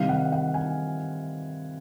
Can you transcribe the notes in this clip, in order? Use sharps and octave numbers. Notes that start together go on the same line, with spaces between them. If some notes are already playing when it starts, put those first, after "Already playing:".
Already playing: C3 D#3 G3 F5
F#5
F#5
G#5